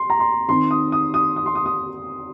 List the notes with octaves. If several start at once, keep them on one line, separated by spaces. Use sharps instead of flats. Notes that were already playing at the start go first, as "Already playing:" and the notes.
Already playing: C6
A#5
C6
D#3 C4 D#4 C6
D#6
D#6
D#6
D#6
C6
D#6
D#6